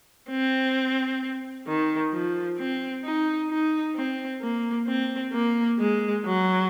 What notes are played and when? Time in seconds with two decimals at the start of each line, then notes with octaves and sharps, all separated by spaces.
0.30 C4
1.67 D#3
2.12 F3
2.58 C4
3.04 D#4
3.49 D#4
3.96 C4
4.41 A#3
4.87 C4
5.32 A#3
5.79 G#3
6.25 F#3